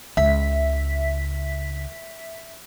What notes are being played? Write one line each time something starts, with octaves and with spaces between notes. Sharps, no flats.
C#2 E5 B6